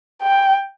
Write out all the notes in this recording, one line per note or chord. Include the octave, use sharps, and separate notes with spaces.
G5